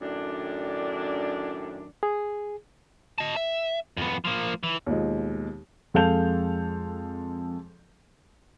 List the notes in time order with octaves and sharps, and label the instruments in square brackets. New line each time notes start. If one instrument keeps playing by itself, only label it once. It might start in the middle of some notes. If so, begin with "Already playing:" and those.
[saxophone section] F#2 A2 D#3 D4
[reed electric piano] G#4
[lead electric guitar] D#5 A5
E5
F2 B3
F3 A#3
E3
[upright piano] D#2 B2 F3 G#3
[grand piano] F2 G#3 A4 F5 G6 F7